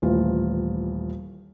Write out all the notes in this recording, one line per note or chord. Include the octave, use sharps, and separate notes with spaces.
D#1 A1 E3 F4